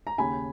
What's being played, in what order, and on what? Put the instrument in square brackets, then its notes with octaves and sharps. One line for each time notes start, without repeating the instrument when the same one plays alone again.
[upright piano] A#5
D#2 C#3 G#5 B5